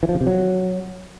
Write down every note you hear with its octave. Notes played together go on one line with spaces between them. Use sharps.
E3
F3
C#3
C3
F#3